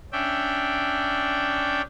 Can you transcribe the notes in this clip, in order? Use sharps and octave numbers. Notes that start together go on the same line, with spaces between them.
C#4 D4 D5 E5 G5